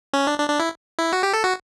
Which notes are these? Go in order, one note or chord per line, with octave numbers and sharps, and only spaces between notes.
C#4
D4
D4
D4
E4
E4
F#4
G4
A4
F#4